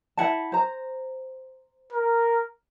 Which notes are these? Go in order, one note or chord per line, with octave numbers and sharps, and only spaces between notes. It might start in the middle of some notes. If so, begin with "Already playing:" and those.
E4 F#5 A5
C5 A#5
A#4